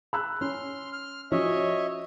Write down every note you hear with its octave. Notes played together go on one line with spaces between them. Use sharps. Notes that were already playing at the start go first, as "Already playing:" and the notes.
B5 E6 F#6
C#4 C6 F6
F6
F3 C#4 F#4 C#5 D#5 E5